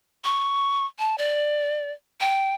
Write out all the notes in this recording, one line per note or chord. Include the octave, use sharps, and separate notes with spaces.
C#6
A5
D5
G5